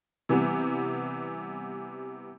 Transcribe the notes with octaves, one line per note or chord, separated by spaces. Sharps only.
C3 E3 G3 B3